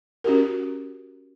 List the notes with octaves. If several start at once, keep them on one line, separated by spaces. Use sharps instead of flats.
C#4 F#4 G4 A#4